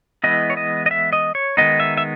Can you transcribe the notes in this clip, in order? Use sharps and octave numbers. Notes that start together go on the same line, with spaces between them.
E3 G#3 B3 E4 D#5
C#5
D#5
D#5
E5
D#5
C#5
D#3 G#3 B3 D#4 D#5
E5
E5